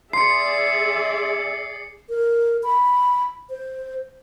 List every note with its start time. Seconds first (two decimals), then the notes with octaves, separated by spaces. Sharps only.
0.13 G#4 D5 E5 C6 C7 C#7
2.09 A#4
2.63 B5
3.50 C5